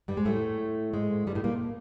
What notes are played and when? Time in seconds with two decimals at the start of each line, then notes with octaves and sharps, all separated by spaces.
0.08 G2 G3
0.17 G#2 G#3
0.25 A2 A3
0.93 G#2 G#3
1.27 G2 G3
1.35 A2 A3
1.44 A#2 A#3